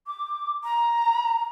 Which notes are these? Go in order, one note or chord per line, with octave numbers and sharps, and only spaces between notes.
D6
A#5